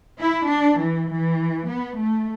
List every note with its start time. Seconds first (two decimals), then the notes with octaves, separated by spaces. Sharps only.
0.20 E4
0.49 D4
0.79 E3
1.09 E3
1.68 B3
1.96 A3